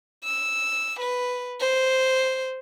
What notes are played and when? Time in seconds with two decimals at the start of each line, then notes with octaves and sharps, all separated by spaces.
0.24 E6
1.00 B4
1.60 C5